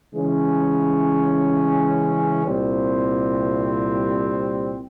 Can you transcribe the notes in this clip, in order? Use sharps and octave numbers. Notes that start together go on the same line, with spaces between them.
C#3 E3 G#3 C#4
C2 A#2 G3 C4